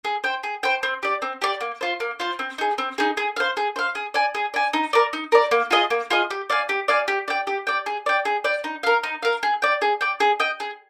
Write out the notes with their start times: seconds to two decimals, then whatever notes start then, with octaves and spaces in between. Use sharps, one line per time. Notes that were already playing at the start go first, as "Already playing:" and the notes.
0.05 G#4
0.24 C5 G5
0.43 G#4
0.63 C5 G5
0.83 C4
1.03 G4 D5
1.22 C4
1.42 G4 D5
1.61 A#3
1.81 F4 C5
2.00 A#3
2.20 F4 C5
2.39 C4
2.58 D#4 G#4
2.78 C4
2.98 D#4 G#4
3.17 G#4
3.36 C5 F5
3.57 G#4
3.76 C5 F5
3.95 G#4
4.14 D5 G#5
4.35 G#4
4.54 D5 G#5
4.73 D#4
4.93 A#4 D5
5.13 D#4
5.32 A#4 D5
5.51 A#3
5.71 F4 G#4 D#5
5.90 A#3
6.10 F4 G#4 D#5
6.30 G4
6.50 D5 F5 G#5
6.69 G4
6.88 D5 F5 G#5
7.08 G4
7.28 D5 G5
7.47 G4
7.67 D5 G5
7.86 G#4
8.06 D5 G5
8.25 G#4
8.44 D5 G5
8.64 D#4
8.83 A#4 F5
9.04 D#4
9.23 A#4 F5
9.43 G#4
9.62 D5 G5
9.82 G#4
10.01 D5 G5
10.20 G#4
10.40 D#5 G5
10.60 G#4